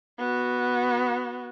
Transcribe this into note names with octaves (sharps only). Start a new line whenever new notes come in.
B3 F#4